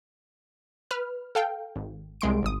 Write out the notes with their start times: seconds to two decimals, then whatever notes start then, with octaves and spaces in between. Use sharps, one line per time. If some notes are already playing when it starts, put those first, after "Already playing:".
0.91 B4 F6
1.35 A4 F5 G5
1.76 G#1
2.21 C2 G#3 C6 D7
2.43 G#1 D#6